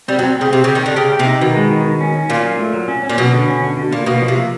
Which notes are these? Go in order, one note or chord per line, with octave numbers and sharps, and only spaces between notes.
G3 C4
F#3
C4
C#3 C4
C3 C4
C#3
G4
D#3
D3 G4
C#3 G4
G4
C3
D#4
B2 D#3
G#3
D#3
D#3
C#4
C#4
A#2 F4
F#3
A3
F#3
C#4
C#4
A#2
B2 F#3
D3
C#4
D3
D3
A#2 A#3
B2 A#3
F3
C3
A#3